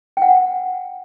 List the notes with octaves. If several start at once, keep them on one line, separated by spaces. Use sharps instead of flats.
G5
F#5